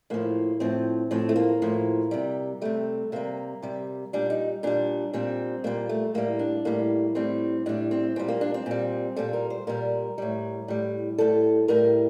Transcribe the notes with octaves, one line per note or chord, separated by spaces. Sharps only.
A2 F3 A#3
A2 F3 C4
A2 F3 C4
A3
A#3
A2 F3
C3 G3
C3 G3 A3
C3 G3 A#3
C3 G3
A#2 G3 D4
D#4
A#2 G3 D4
A#2 G3 C4
A#2 G3 A#3
A3
A2 G3 A#3
D4
A2 G3 A#3
A2 G3 C4
A2 G3 D4
C4
A#2 G3 C4
A#3
D4
C4
A#2 G3
A#2 G3 A4
A#4
C5
A#2 G3 A#4
A2 G3
A2 G3
A2 G3 A4
A2 G3 A#4